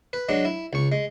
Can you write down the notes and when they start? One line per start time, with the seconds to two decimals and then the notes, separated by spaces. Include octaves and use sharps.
0.13 B4
0.29 F#3 G#3 D4
0.45 E4
0.73 C#2 C#6
0.92 G#3